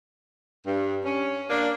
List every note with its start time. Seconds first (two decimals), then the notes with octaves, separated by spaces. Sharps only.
0.65 G2
1.04 C#4
1.49 A#3 D4